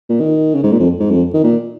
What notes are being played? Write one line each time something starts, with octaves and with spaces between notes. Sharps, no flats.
A#2
D#3
C#3
G#2
A#2
F2
G#2
F2
D#3
A#2